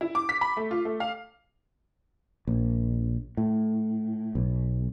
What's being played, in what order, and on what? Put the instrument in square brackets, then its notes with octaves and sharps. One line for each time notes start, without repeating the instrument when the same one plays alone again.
[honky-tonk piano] E4
D6
B6
B5
A3
F4
A3
F5
[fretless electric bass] A#1
A2
B1